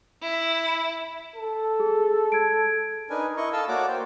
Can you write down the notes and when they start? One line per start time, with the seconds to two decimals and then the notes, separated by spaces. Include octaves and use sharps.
0.21 E4
1.36 A4
1.80 G#4
2.32 G#6 D7
3.10 D4 D#4 A#4 B4 G#5
3.37 E4 D#5 C#6
3.53 A4 D#5 F5 A5 E6
3.68 A#3 F#4 C#5 D5 F#5 D6
3.88 C5 G5